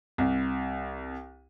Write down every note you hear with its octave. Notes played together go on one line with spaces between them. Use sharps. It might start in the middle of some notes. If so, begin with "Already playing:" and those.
C2